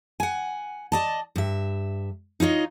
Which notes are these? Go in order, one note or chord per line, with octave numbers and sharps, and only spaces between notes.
F#5 G#5
D5 D#5 A5
G2 E5
D#4 F4 C#5 D#5